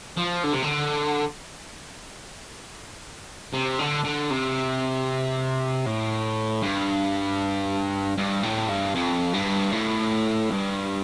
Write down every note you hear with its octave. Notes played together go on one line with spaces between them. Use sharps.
F3
D3
C3
D3
C3
D3
D3
C3
A2
G2
G2
A2
G2
F2
G2
A2
G2